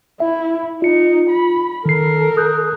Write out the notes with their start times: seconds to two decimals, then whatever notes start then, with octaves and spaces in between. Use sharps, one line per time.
0.20 E4 E5
0.82 D#4 F4 C#7
1.30 B5
1.86 D#3 A4 A#4 C7
2.37 D#6 F#6 G6